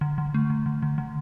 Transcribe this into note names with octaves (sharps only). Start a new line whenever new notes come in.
D3
D3
A3
D3
D3
D3
D3